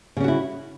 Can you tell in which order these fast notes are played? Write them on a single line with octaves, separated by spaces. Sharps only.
C#3 C#4 F#4 E4